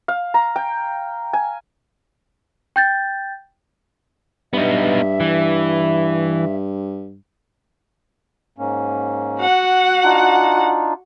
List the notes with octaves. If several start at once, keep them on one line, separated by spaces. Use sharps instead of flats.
F5
A#5
G5
G#5
G5 G6 A6
G2 B3 D#4 E5
E3
G#2 A#3 C#4
F#4 F#5
D4 D#4 F4